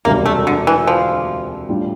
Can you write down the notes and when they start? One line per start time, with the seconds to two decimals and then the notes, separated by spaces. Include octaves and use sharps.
0.05 E1 D2 C3 G3 A#3
0.26 A3
0.47 D3
0.67 E3
0.87 F3
1.69 A2 G3 D4 F4